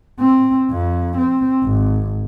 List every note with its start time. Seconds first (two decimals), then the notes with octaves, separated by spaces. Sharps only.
0.20 C4
0.71 F2
1.18 C4
1.64 G#1